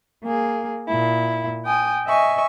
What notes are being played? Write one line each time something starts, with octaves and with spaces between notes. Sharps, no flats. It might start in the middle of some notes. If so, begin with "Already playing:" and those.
A#3 G#4
A#2 E4
G5 G#5 D#6
D#5 E5 G#5 C#6